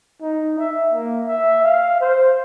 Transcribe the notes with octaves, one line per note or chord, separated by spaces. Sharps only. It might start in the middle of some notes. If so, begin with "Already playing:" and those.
D#4
E5
A#3
E5
F5
C5